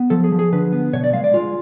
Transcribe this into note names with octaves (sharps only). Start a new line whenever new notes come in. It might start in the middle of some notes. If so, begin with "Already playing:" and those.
Already playing: B3
F3 A4
G#4
F3
G#4
D3 B4
B3
B2 C#5
D5
G#3 F5
D5
G#3 F4